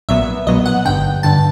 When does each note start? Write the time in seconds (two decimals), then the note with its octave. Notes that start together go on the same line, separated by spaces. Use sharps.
0.09 B1 A#2 F#3 B3 E5
0.47 B1 A#2 F#3 B3 D#5
0.66 F#5
0.85 G#1 G2 D3 G5
1.23 G2 D3 A5